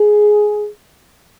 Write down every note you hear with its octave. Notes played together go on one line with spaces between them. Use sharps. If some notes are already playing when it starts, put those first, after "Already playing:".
Already playing: G#4